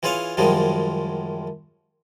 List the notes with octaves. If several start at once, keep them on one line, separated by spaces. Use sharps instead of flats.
E3 F4 G#4 C#5 F5
F#2 D#3 F3 G3 G#3